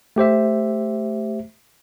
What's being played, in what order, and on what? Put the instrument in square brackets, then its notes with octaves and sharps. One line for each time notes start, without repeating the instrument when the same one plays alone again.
[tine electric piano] A3 G4 C5 E5